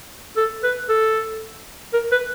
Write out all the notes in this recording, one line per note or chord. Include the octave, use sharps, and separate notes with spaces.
A4
B4
A4
A#4
B4